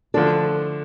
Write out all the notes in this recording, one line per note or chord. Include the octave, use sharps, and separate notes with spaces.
D3 F3 A3 D4 A4